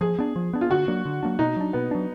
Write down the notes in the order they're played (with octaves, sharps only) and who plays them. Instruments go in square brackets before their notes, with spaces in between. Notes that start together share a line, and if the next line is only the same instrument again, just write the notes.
[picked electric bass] F3 [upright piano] G#4
[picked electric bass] B3 D4
F3
B3 D4
[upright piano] F4
[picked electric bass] D3 [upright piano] F#4
[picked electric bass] F#3 A#3 D4
D3
F#3 A#3 D4
[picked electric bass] B2 [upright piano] D#4
[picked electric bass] F#3 D4
[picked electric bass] B2 [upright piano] B3
[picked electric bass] F#3 D4